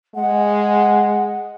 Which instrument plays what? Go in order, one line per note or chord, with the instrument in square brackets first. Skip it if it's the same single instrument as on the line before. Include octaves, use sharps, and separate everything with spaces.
[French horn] G#3 [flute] F#5